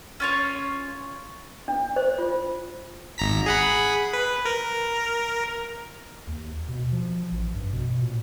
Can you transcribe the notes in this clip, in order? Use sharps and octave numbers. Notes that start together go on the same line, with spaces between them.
C#4 F4 C#5
D4
C5
F4
G#1 A#5 B6
G#4 F#5 B5
B4
A#4
D#2
B2
F3
A1
G2
B2
A#2